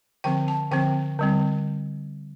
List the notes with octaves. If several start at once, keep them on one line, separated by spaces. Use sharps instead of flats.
D3 F3 C4 G5
A5
D3 F3 C4 G5
D3 G3 C4